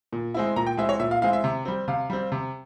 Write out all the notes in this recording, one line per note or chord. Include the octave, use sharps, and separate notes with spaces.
A#2
G#3 C4 E4
A#2 A#5
G5
G#3 C4 E4 E5
C#5
A#2 E5
F5
G#3 C4 E4 F5
E5
C3
G3 C4
C3 F5
G3 C4
C3